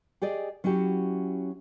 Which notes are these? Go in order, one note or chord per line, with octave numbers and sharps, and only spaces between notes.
G4 G#4 D5 D#5
F#3 C#4 E4 F#4 G4